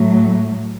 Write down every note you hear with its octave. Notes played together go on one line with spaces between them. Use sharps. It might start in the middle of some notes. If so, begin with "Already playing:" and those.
Already playing: A2 F#3 A3